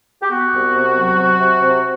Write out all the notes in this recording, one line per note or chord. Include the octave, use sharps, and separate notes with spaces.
G4
B3 F#4
C2
C3
F#3
C3
C3
C3